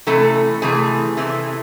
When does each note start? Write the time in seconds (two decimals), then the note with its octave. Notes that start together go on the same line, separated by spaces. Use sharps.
0.07 C3 E3 A3 A4
0.62 C3 E3 A3 G#4
1.17 C3 E3 A3